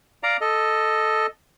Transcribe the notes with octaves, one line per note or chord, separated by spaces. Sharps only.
D5 F5 A#5
A4 D#5